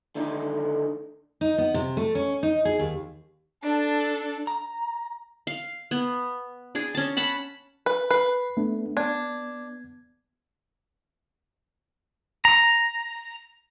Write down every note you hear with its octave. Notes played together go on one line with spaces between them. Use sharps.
D3 D#3 A3 D#4
D#4
B3
C3
A3
C#4
D#4
G#4
D#2
D4 A4
A#5
F5
B3
D4 G#4
C#4 A5
F#5 A5 B5
B4
B4 C7
A3 B3 D4
B3 D4 G#6
A#5